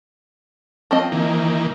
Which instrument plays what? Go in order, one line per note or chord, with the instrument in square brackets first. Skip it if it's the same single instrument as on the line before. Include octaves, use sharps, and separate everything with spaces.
[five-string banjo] F3 C4 D#5
[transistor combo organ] D#3 E3 A#3